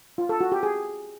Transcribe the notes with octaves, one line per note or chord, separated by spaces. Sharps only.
F4
A4
F#4
G4
G#4